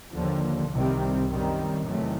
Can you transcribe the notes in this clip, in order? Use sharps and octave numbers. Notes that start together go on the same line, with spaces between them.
D#2 D3 F3
C2 C3 D#3 G3 C4
F#2 D#3 G3 C4
E2 C3 D#3 F#3 A3